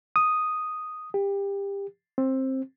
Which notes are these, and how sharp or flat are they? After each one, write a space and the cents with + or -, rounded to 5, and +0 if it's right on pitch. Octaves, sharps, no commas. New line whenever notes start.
D#6 +0
G4 +25
C4 +15